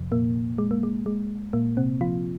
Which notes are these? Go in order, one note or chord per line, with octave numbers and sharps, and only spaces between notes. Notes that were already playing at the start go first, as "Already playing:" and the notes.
Already playing: F2 C3 F3
A#2 A#3
G#3
A#3
G#3
G#3
A#2 A#3
C3 C4
F3 F4